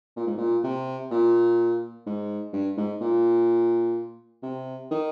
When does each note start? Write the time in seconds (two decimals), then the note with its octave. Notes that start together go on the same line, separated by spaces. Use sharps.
0.16 A#2
0.27 G#2
0.38 A#2
0.64 C3
1.11 A#2
2.06 G#2
2.53 G2
2.77 G#2
3.01 A#2
4.43 C3
4.91 D#3